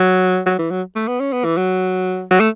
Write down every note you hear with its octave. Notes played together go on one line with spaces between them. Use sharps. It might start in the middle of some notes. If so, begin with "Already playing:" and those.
Already playing: F#3
F#3
E3
F#3
A3
B3
C#4
B3
E3
F#3
F#3
A3